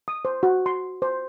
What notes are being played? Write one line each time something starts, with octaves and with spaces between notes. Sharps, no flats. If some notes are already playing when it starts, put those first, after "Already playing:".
D#6
C5
F#4
C6
C5